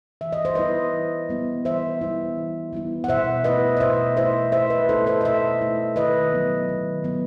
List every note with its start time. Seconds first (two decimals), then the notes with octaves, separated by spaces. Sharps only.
0.21 E3 E5
0.32 D#5
0.45 C5
0.55 G3 B3 E4 B4 D#5
0.93 E3
1.29 G3 B3 E4
1.65 E3 C5 E5
2.01 G3 B3 E4
2.37 E3
2.73 G3 B3 E4
3.04 F#5
3.08 B2 C5 E5
3.44 A3 E4 B4 D#5
3.77 D#5
3.80 B2 C5 E5
4.17 A3 E4 C5 E5
4.52 B2 C5 E5
4.70 B4 D#5
4.89 A3 E4 A4 C5
5.06 A4 C5
5.21 D#5
5.24 B2 C5 E5
5.61 A3 E4
5.96 D#3 B4 D#5
6.32 F#3 B3
6.69 D#3
7.04 F#3 B3